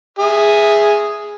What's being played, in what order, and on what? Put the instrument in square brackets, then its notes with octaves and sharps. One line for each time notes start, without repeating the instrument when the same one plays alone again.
[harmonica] G#4 E5